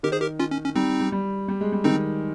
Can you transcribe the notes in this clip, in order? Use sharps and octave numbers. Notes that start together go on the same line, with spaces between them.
D#3 G4 A#4
G#4 C5
G4 A#4
C#4 F4
C#4
C#4
G3 C4 D#4
G3
G3
G3
G#3
G3
D#3 C4 D#4